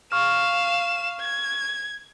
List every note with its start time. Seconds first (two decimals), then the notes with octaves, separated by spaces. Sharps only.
0.12 F5 C#6 F6 E7
1.20 G#6